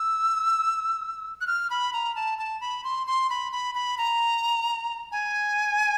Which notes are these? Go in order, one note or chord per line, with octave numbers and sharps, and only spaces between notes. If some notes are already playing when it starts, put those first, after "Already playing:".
Already playing: E6
F#6
F6
B5
A#5
A5
A5
B5
C6
C6
B5
B5
B5
A#5
G#5